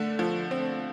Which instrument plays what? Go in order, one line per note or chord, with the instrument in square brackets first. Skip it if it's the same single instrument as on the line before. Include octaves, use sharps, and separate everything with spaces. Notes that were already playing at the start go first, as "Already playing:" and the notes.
Already playing: [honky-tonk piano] D3 A3
F3
C4